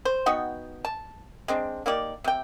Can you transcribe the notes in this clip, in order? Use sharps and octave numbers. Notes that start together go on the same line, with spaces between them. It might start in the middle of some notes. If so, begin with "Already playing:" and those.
C5
B3 D#4 F#4 G5
A5
G#3 C4 D4
A#3 D#4 G4 D5
C3 G5